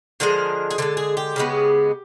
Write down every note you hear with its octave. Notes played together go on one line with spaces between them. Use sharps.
D3 F3 G#3 A#4
G#4
D3 F3 G#3 A4
G#4
G4
C#3 F3 G#3 B3